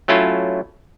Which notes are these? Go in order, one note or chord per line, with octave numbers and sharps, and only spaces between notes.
F#3 A3 C#4 E4 F4